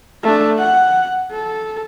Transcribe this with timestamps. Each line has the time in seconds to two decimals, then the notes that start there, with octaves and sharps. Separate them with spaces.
0.23 A3 D4
0.58 F#5
1.31 A4